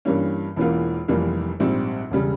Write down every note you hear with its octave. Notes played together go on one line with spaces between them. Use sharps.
G2 E3 G3 A#3 C#4
E1 E2 E3 A#3 F4
F1 F2 E3 G3 A#3
A#1 G#2 G3 C4
E1 C#3 G3